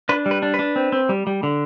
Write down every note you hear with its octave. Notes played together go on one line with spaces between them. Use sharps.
D4 B4
G3
B4
D4
B4
D4
C4
C4
G3
G3
D3